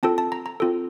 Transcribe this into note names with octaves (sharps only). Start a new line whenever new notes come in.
C4 F4 A4 A5
A5
A#5
A#5
C4 F4 A4